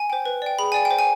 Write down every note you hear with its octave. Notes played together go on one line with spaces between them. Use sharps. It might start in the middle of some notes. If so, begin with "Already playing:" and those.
Already playing: G#5
C5 G5
B4
D5 G5
G#4 B5
D5 G5 G#5
G5
C5
G#5